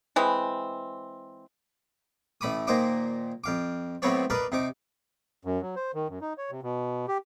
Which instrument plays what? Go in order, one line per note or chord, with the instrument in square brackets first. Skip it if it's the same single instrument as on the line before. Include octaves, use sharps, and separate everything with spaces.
[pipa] E3 G#3 C4
[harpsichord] A1 A3 B5 D6 D#6
A#2 D#3 A#3 C5 D#5 D6
F2 F5 D6
A2 F#3 B3 C4 C#5 D5
A#4 B4 D5 D#5 F5
C3 D#4 D6
[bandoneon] F#2
F#3
C5
D#3
F#2
D#4
C#5
C3
B2
G4